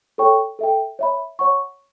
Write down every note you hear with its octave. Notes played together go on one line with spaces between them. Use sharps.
A4 C#5 G5 C#6
A4 E5 G5
C#5 E5 B5
C#5 F#5 C#6